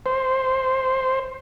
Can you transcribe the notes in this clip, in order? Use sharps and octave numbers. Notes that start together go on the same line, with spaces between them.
C5